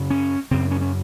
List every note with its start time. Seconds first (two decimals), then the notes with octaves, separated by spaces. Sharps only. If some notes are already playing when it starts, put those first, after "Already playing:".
Already playing: F#2 C#3
0.10 C#4
0.51 F#2 C#3 C4
0.71 C#4
0.81 C#4